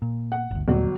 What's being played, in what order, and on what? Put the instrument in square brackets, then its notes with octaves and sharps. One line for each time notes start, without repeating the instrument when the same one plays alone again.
[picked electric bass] A#2
[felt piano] F#5
[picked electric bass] G1 D2
[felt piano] G1 F#3 [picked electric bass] D#2 A#2 A3